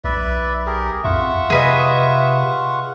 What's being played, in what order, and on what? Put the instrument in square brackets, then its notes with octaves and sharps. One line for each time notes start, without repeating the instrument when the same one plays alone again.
[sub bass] B1 [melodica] B4 D5 E5
[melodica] G4 G#4 A#4
[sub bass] F2 [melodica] F4 F#5 C#6 [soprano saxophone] E5
[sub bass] C3 [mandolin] G#4 B4 D#5